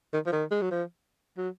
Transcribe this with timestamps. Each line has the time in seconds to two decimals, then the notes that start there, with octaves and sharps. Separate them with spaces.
0.13 D#3
0.26 F3
0.32 D#3
0.51 G#3
0.61 F#3
0.71 F3
1.37 F#3